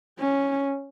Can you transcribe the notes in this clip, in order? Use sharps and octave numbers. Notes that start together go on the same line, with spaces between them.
C#4